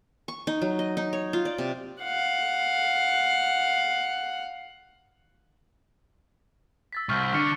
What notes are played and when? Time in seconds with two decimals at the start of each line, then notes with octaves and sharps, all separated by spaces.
0.28 C#6
0.47 D#4
0.62 F#3
0.79 D#5
0.97 D#4
1.13 C#5
1.33 F4
1.45 D5
1.58 C3
2.03 F5 F#5
6.93 E6 A6 B6
7.09 C2 C#6 F6 G6
7.33 D3 F6 C#7